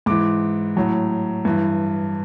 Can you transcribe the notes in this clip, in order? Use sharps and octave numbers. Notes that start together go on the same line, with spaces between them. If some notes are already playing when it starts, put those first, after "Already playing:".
G#2 E3 D6
A2 F#3
G2 E3